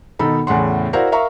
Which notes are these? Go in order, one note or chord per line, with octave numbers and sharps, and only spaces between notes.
B2 D#3 D#4 A4 B5
E2 A2 C#3 F#5 C6
E4 F#4 A#4 C5 D5 F5
A#4 E5 F5 A#5 C#6